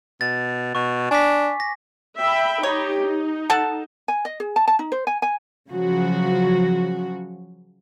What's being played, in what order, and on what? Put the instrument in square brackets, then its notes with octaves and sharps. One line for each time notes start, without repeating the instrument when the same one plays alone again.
[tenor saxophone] B2 [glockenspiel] A6
[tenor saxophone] B2 [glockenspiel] C#6
[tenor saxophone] D4 [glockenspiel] G#5 D6 B6
[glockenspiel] A#6
[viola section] E5 G5 B5
[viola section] D#4 G4 [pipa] C#5
[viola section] D#4
[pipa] A4 F#5 A5
[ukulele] G#5
D#5
G#4
A5
A5
D#4
C5
G#5
G#5
[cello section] C#3 F3 F#3 F#4